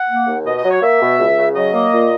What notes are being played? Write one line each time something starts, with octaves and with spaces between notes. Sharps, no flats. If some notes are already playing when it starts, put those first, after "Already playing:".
Already playing: F#5
A#3
D#2
B2 D#5
D#5
F#3
C#5
A#3 E5
B2
C#2
C#3
F#3 D#5
A#3
A#2